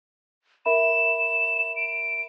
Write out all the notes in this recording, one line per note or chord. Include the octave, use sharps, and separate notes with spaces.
A#4 E5 B5 E7
D7